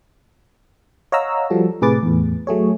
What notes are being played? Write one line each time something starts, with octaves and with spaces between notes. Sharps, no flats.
C#5 D#5 F5 F#5 A#5 E6
F3 G3 F#4 A4
A2 C3 G#4 B4 D6 A6
E2 A2
F#3 A3 G#4 C#5